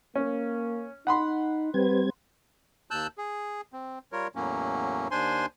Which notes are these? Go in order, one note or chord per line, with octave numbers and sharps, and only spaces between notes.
A#3 C#4
D#4 F#5 B5 C6
G3 C4 B4 G#6
D#2 A5 E6 F#6 G6
G#4
C4
G3 F4 A#4 C#5
E2 A2 F#3 A#3 C#4
D#2 D4 C5 G#5 C6